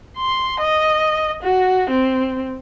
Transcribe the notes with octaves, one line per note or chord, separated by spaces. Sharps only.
C6
D#5
F#4
C4